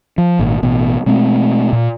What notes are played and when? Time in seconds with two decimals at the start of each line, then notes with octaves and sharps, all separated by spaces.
0.18 F3
0.39 G#1 A#2
0.63 A1 B2
1.06 B2 G#3 A3 C4
1.73 A#2